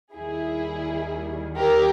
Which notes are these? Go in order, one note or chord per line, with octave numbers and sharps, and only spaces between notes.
D#2 D#3 G3 E4 G#4
G4 A#4